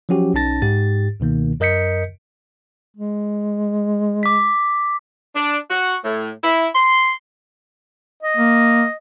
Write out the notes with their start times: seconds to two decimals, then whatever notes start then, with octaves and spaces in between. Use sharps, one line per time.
0.09 F3 F#3 C#4 F#4 G4
0.34 B1 C#4 D#4 A5 A6 A#6
0.62 G#2 G4 A6
1.20 C#2 B2 D#3 A#3
1.60 F#2 A#4 D#5 G6 B6 C#7
2.97 G#3
4.23 D6 B6
5.34 D4
5.70 F#4
6.04 A2
6.43 E4
6.75 C6
8.23 D#5
8.37 A#3